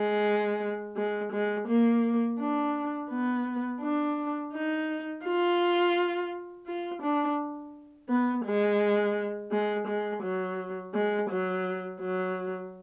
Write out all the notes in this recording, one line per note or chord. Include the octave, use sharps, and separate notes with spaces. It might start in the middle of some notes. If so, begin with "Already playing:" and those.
Already playing: G#3
G#3
G#3
A#3
D4
B3
D4
D#4
F4
F4
D4
B3
G#3
G#3
G#3
F#3
G#3
F#3
F#3